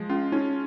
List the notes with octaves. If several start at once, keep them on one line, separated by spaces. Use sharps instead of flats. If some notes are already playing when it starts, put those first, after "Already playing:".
Already playing: F3 G#3
C#4 F4
C#4 D#4